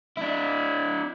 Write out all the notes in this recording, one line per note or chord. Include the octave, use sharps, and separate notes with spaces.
D4 E4